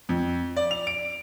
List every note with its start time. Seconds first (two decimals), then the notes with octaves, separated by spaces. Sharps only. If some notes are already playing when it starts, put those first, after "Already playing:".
0.09 F2
0.56 D5
0.71 F7
0.87 D7